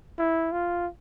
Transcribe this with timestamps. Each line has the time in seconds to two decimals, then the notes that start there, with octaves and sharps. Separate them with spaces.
0.18 E4
0.52 F4